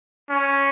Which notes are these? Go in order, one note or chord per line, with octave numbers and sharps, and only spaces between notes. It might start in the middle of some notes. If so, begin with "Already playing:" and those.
C#4